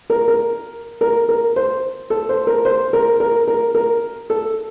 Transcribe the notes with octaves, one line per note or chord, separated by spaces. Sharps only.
A#4
A#4
A#4
A#4
C5
A4
C5
A#4
C5
A#4
A#4
A#4
A#4
A4